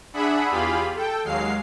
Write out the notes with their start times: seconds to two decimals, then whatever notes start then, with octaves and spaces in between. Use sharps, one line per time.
0.14 D4 G#4 E5 F#5 B5
0.51 E2 F4 G4 G#4 F5 B5
0.95 A4 G5
1.24 D#2 F#3 G#3 F5 C7